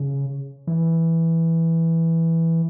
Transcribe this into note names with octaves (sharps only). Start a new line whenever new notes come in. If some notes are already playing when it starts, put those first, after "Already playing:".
Already playing: C#3
E3